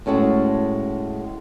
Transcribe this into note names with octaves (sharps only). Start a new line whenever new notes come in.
A2 G#3 C#4 F#4 A4